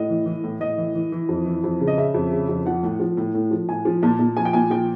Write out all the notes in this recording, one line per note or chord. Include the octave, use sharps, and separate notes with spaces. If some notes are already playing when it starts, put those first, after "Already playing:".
Already playing: A2 D#5
E3
E3
A2
A2 D#5
E3
E3
E3
F2
E3
F2
C#3
D#5
C#3 E5
F2
C#3
F2
F3 F#5
A2
F3
A2
A2
F3
A2 G#5
F3
A#2 A5
A#2
F3 G#5
G5
A#2 G#5
F3 G5